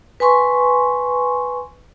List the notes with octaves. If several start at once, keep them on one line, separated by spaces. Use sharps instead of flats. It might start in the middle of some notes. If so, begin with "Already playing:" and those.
B4 G#5 C6 C#6